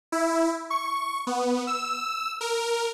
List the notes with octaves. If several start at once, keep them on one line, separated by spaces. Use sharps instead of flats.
E4
C#6
B3
E6
A#4